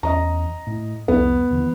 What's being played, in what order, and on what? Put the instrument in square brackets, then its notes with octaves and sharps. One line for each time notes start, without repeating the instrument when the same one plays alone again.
[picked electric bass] E2 C#4 [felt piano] D#5 A#5
[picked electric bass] A2
[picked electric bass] C2 F2 [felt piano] B3
[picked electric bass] D#2 D3 E3